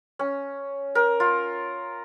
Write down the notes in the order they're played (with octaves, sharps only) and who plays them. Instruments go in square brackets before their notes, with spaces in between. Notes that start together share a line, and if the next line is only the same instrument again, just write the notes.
[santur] C#4
A#4
F4